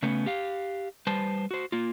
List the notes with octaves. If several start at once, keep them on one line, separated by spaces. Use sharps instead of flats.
C#3 A3 B3 C#4
G4 F5
G3 B4 C5 A5
F#4 C5
A#3 F4